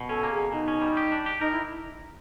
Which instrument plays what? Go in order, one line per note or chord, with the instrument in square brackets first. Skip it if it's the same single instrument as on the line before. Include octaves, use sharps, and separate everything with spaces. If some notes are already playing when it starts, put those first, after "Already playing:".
Already playing: [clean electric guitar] B2
[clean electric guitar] C#4 [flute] A4
[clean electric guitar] A#3
[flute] G#4
[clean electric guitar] B2
[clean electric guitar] B2 [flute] D#4
[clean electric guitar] C#4
G3
G4
D4
G4
[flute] D#4 [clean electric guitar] A#4
[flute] E4